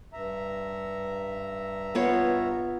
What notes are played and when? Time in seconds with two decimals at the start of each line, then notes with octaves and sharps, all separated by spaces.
0.13 G2 E5 A#5
1.95 B3 F4 C#5